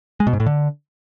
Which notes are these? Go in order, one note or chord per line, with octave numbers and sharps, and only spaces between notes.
G#3
B2
G#2
A2
D3